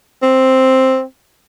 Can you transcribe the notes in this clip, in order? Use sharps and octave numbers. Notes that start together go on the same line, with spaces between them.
C4